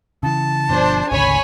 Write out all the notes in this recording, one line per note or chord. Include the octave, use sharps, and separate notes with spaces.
C#3 E3 A5
G1 B2 F3 D4 C5
G#1 D2 C#3 C#5 G#5 B5